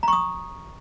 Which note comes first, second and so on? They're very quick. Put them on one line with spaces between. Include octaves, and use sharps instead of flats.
A#5 C#6 D#6